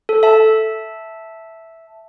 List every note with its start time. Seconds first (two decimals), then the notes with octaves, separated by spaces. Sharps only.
0.09 A4
0.23 E5 A5